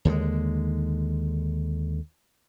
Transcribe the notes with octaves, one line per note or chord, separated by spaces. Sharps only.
D#2 D3 F3 G#3